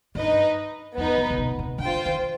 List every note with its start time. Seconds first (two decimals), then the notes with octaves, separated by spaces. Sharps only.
0.15 G2 D#4 B4 D#5
0.97 F2 B3 D#4 B4
1.18 G2
1.30 C3
1.38 B2
1.59 C3
1.78 D3 F4 C5 G5
2.06 D#3